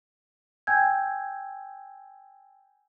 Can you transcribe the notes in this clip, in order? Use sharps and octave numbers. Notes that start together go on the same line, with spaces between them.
G5 G#5 E6 G6 G#6